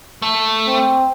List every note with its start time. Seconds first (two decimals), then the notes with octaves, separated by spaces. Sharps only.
0.22 A3
0.67 C4